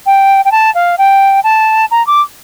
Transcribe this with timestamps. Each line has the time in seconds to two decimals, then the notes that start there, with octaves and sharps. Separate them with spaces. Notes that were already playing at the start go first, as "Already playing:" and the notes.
0.06 G5
0.45 G5
0.52 A5
0.75 F5
0.98 G5
1.44 A5
1.91 A#5
2.07 D6